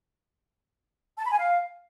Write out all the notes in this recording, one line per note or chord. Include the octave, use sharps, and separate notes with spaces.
A5
B5
G#5
F5